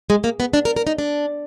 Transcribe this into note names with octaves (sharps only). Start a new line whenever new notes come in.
G#3
A#3
B3
D4
A#4
A#4
D#4
D4